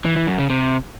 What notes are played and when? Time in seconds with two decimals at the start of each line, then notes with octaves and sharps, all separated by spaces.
0.05 E3
0.16 E3
0.27 F#2
0.39 C#3
0.50 C3